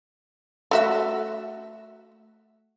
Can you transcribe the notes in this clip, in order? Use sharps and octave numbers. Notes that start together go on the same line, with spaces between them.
A3 F#4 E5